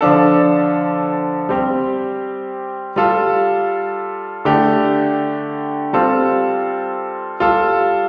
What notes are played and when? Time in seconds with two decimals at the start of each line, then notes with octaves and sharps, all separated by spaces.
0.01 D3 F3 D4 A4
1.49 G3 C4 G4
2.96 G3 F4 A4
4.45 D3 A3 D4 G4
5.93 G3 C4 F4 A4
7.40 G3 F4 A4